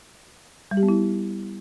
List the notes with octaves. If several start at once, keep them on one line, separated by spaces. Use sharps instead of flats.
G3
G4
B3
E4